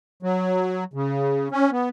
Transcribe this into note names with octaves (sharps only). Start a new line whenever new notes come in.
F#3
C#3
C#4
B3